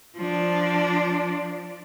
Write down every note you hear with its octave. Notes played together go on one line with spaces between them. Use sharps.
F3 D4